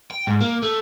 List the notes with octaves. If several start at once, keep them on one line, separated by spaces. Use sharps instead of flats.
G5
G#2
A#3
A3